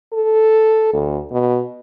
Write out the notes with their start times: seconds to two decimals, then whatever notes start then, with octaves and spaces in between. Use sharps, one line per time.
0.13 A4
0.93 D2
1.32 B2